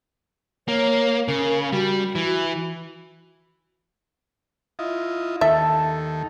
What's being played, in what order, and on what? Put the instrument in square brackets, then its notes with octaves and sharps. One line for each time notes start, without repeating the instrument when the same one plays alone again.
[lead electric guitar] A#3 [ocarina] C#5
[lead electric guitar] C#3 [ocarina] A#4
[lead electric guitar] G3 [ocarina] F#4
[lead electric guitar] E3
[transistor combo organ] E4 F4 D#5
[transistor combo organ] D#2 D#3 [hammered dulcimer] A4 [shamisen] E5